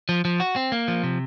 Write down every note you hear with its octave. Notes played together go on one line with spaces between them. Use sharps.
F3
F3
F#4
C4
A#3
F3
C3